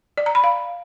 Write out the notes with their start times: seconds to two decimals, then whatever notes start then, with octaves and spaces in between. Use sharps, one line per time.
0.18 D5
0.26 A#5
0.35 B5
0.44 F5